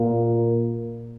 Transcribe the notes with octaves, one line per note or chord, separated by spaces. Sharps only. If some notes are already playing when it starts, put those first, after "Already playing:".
Already playing: A#2 A#3